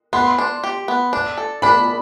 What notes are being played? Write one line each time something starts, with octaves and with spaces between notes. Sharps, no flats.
B3 C6
D4
G4
B3
D4
A4
D4 B5